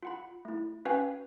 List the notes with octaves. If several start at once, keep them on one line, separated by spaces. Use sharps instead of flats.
F4 F#5 B5
A3 E4
C#4 F#4 B4 F5 G5 G#5